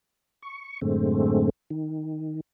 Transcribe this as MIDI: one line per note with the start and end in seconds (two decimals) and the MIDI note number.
0.42 0.80 85
0.81 1.50 42
0.81 1.50 45
0.81 1.50 50
0.81 1.50 56
0.81 1.50 57
0.81 1.50 60
1.70 2.40 51